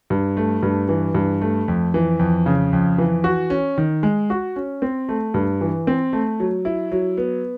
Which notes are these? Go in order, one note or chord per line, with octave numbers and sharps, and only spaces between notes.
G2
A3
G2
E3
G2
A3
F2
E3
F2
C#3
F2
E3
F#4
C#4
D#3
G#3
F#4
C#4
C4
A3
G2
E3
C4
A3
F#3
E4
F#3
B3